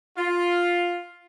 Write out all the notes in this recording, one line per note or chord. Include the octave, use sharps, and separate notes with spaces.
F4